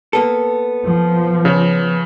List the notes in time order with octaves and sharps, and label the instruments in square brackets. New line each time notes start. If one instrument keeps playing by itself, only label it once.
[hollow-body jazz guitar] A#3 B3 A4
[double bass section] F3
[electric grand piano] C#3 C#5